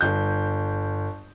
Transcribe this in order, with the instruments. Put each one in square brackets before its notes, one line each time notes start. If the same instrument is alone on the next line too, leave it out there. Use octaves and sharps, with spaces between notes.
[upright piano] G1 G6